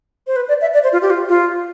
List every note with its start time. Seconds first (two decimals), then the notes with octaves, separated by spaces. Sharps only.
0.27 C5
0.36 B4
0.48 D5
0.61 E5
0.74 D5
0.83 C5
0.93 F4
1.02 G4
1.10 F4
1.29 F4